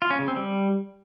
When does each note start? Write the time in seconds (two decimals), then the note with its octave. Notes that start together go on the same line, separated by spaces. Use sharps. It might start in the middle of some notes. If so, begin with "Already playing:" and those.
0.02 F4
0.10 C#4
0.19 C#3
0.28 C4
0.36 G3